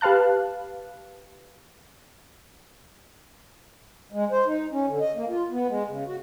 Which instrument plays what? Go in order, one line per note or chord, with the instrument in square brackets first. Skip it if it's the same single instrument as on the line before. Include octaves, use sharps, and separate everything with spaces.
[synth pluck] G4 B4 F5 A5 F#6
[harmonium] G#3
C5
D#4
C#4
D3
D#5
A#3
F4
B3
G#3
C#3
F#4